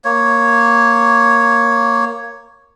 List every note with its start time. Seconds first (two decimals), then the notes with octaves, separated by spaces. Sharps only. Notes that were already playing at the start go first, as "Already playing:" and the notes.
0.05 A#3 C#5